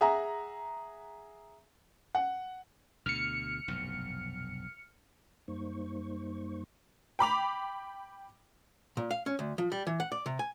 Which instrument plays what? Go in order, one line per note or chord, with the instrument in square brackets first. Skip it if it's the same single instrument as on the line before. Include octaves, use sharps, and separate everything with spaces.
[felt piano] G#4 E5 F#5 A#5
F#5
[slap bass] D2 B2 D3 [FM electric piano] F6 C#7
[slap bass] F1 B1 G2
[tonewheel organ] F#2 G3 A#3 D#4 C5 C#6
[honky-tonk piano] G5 B5 D6 F7
[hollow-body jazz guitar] A#2
F5
C#4
D2
F3
G3
E3
F#5
D5
C3
G#5